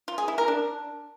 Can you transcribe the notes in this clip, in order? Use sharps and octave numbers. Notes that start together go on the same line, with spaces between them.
F4
G#4
E4
A#4
D4